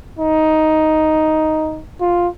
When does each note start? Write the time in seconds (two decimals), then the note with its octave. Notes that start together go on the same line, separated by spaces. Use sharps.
0.19 D#4
2.01 F4